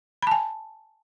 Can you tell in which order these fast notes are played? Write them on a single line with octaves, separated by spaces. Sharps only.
B5 A5 G#5